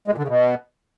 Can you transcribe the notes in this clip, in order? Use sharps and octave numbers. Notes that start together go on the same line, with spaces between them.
G#3
A#2
D3
C#3
B2